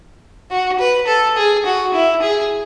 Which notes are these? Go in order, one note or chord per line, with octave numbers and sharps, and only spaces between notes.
F#4
B4
A4
G#4
F#4
E4
G#4